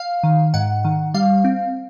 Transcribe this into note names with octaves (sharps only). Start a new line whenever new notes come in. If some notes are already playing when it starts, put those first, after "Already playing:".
Already playing: F5
D#3
G#2 F#5
D#3
G3 F5
C4